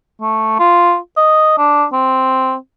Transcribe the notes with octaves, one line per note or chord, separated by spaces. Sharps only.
A3
F4
D#5
D4
C4